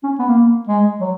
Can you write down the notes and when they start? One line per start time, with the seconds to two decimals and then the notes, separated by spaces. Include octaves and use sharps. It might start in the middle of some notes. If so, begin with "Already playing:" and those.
0.04 C#4
0.19 B3
0.29 A#3
0.68 G#3
1.01 F#3